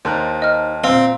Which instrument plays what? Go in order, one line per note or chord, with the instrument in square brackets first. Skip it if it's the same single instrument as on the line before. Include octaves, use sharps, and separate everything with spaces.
[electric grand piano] D#2 A5 F#6 [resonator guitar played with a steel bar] D#4 A#4 C5
[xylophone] D#5 F6
[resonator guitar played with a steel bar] A#2 F5 [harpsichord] C4